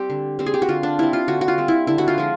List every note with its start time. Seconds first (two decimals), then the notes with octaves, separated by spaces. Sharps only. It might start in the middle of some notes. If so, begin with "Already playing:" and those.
Already playing: G3 C4 G4
0.10 D3
0.39 G3 C4
0.46 G#4
0.54 G4
0.62 F#4
0.68 D3 F4
0.83 D4
0.99 G3 C4 E4
1.13 F4
1.28 D3 F#4
1.41 F#4
1.48 F4
1.58 G3 C4
1.68 E4
1.87 D3 E4
1.98 F#4
2.08 F4
2.18 F3 G#3